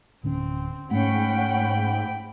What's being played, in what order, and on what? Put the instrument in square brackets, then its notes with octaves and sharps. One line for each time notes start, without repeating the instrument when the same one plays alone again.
[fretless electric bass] D1 D3 C#4 [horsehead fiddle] C4
[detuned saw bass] G#2 [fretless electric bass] A3 [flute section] C#4 F#5 [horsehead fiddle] G5 B5